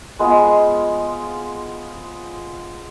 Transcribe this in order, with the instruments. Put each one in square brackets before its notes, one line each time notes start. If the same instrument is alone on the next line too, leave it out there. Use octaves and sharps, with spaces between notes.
[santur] G#3 B3 F4 C5